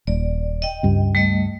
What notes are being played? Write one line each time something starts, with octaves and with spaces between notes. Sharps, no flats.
D#1 D5
D#5 G5
C#2 G2
G3 A3 D#5